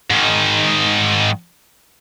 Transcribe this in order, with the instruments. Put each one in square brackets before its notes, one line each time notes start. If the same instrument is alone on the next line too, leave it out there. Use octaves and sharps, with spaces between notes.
[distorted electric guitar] G#2 D#3